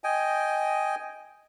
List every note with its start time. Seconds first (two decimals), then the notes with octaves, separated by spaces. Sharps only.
0.04 D#5 G5 G#5